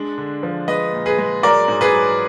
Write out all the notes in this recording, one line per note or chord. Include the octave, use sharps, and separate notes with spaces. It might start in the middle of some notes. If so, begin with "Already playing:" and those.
Already playing: G#3 D4
D3
F3
G#3 B4 D#5
A#2
G#4 B4
G#3
F#3 A#4 D5
G#2
G#4 B4
F#3